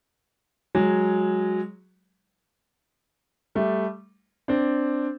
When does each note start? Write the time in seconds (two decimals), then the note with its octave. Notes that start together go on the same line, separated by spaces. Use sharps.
0.75 F#3 G#3
3.55 G3 A3
4.48 C4 D4